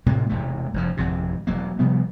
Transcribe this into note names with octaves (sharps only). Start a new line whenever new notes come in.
A2 C3 G#3 A#3
E1 G#2 C3 A3
F1 G2 F3
G#1 F2 C3
E1 F#3 A#3
C3 F3 G3 B3